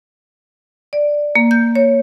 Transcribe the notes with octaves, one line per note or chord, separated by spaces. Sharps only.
D5
A#3
G6
C#5